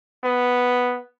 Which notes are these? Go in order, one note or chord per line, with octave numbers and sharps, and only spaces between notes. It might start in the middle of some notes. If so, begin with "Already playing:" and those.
B3